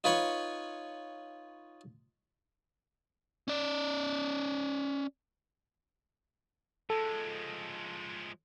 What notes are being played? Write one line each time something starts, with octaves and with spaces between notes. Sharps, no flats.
D#4 F4 B4 C#5 B5 C#6
C#4 D5
F3 G#3 A4